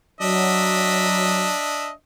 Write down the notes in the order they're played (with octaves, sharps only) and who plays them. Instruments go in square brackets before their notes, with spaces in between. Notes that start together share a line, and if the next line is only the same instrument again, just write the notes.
[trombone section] F#3 [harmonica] D4 D#5 E5